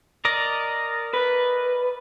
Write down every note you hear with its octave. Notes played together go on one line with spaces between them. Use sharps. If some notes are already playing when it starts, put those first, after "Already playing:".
A#4 D5 D#5
B4